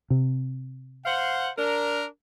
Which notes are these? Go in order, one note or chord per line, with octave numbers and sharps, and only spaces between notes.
C3
C5 F5 F#5
D4 A#4